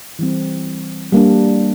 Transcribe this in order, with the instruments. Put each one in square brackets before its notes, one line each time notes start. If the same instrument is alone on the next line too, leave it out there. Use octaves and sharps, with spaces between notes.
[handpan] E3 G3 C4
G3 A#3 D4